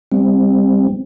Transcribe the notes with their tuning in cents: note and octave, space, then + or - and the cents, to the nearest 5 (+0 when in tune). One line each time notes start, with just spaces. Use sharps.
G3 +25 C4 +5